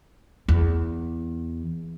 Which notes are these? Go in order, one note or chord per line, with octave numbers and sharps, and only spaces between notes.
E2